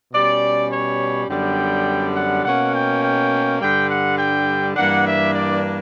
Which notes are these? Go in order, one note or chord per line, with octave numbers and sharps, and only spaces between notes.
B2 G3 C#4 D5
C#5
F#2 D3 G3 B3 G5
F#5
B2 A#3 C#4 F#5
G5
G5
G2 D3 G3 G5
F#5
G5
G2 E3 A#3 D4 F#5
E5
D5